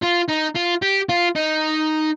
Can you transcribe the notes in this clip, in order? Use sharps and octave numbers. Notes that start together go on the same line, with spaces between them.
F4
D#4
F4
G4
F4
D#4